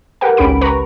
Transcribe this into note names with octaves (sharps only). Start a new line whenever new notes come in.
G4 A#4 B4 F#5 G5
G#1 C#2 C#4 G4 B5 D7
B4 A#5 C#6